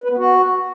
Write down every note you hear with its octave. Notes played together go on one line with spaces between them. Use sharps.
B4
B3
F#4